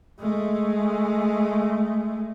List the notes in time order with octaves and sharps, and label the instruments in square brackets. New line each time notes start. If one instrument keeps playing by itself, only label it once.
[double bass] G#3 A3